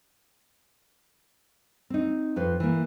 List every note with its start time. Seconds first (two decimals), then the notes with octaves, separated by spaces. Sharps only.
1.90 C4 D#4
2.36 F2 F4 B4 C5
2.60 E3 A#3